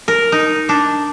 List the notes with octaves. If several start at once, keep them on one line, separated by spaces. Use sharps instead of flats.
A#4
D#4
D4